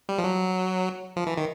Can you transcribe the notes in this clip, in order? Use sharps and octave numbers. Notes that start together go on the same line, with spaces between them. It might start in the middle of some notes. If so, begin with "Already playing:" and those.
G3
F3
F#3
F3
E3
D#3